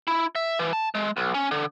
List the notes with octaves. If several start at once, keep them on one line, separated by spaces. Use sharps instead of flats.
E4
E5
E3
A5
G#3
B1
C#4
D3